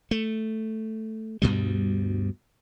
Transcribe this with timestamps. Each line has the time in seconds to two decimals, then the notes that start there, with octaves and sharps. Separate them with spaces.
0.11 A3
1.42 D2 G2 B2 G3